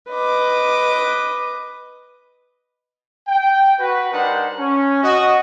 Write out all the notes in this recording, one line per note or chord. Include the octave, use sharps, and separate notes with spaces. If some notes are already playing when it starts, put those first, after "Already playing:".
B4 D#5 D6
G5
F#4 B4
G3 D4 D#4 A#4 C5 F#5
C#4
F#4 D#5